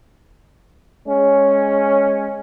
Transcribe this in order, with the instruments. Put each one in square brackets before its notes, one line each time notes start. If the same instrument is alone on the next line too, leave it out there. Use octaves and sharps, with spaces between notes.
[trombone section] G#3 C#4